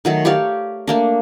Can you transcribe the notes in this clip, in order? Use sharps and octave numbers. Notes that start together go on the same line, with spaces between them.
D#3 F#3 A3
G4 C#5 D5 F5
A3 A#3 D4